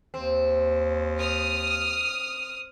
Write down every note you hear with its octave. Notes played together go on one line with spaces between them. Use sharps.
D#2 C4
D#6 F6